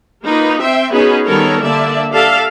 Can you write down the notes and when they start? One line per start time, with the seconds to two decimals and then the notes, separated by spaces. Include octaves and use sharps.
0.24 A#3 D#4 F4 B4
0.61 C4 E5 G5 C6
0.93 B3 C#4 D#4 F#4 G#4 B4
1.25 D#3 G3 B3 A4 A#4 C#5
1.62 D3 A#3 D5 E5 A5
2.11 G4 A4 D5 E5 F5